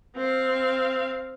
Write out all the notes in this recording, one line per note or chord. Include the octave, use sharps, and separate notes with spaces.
C4 F5